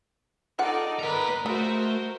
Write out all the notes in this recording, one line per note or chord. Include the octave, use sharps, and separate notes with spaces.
D#4 F4 G#4 A4 D5 F#5
A#4 B4 D5 A#5
G#3 A3 F#4 A#4 C5